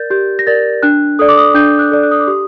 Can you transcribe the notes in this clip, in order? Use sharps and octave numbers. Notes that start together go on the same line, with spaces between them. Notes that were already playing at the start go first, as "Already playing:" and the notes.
Already playing: A#4 D5 G6 A6
G4 G6
A#6
A#4 D5 A6
D4 F#6
A4 D5 D#6
D6
D#6
D4 G6
F#6
A4 D5
F#6
D#6
D6
G4 D#6